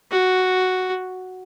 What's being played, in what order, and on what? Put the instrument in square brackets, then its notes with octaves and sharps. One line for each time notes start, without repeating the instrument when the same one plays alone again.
[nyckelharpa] F#4